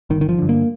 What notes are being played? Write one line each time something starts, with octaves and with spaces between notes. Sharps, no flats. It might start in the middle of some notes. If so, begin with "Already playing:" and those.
G1 D#3
D#3
F3
G2 D3
A#3